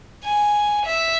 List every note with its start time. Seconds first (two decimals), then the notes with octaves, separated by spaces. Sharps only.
0.25 G#5
0.86 E5